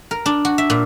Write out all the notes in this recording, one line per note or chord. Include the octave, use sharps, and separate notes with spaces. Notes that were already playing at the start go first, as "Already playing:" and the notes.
A#4
D4
F#4
E5
A#2